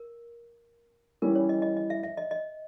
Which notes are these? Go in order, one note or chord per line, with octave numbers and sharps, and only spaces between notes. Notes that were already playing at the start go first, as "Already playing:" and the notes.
Already playing: A#4
E3 G3 C#4 E4 A#4
C#5
D#5
D#5
D#5
E5
E5
D#5
D#5